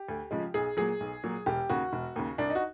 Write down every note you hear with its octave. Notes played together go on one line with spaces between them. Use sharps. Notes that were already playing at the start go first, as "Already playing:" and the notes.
Already playing: G4
D2
C#3 F3 G#3
B1 G#4
A#2 F#3 G#4
B1
A#2 F#3
E1 G4
D#2 C#3 F#4
E1
D#2 C#3
C2 D4
D#4
F#4